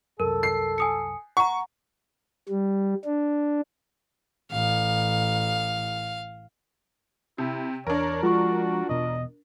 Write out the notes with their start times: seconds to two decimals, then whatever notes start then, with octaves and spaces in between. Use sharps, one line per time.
0.20 C2 F#2 A4 A#4
0.43 C7
0.78 G#5 D#6 C#7
1.37 F#5 A#5 C#6
2.49 G3
3.05 D4
4.51 A1 F5
7.38 C3 E4
7.87 E2 D4 A#4 C#5
8.23 F3 G#3 F4 F#4 C#6
8.89 E1 B2 D#5